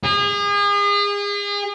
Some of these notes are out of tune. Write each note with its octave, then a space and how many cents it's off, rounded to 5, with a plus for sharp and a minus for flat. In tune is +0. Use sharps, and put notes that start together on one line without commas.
G#4 -35